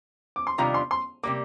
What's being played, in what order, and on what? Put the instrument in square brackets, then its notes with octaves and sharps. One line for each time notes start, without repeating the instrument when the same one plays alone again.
[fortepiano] D6
C6
[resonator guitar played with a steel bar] C3 D#3 G3 D4 F4 [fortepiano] A#5
[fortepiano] C6
C6
[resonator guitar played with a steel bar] C3 G3 A#3 [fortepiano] D6